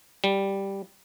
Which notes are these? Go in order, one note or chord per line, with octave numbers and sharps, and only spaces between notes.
G3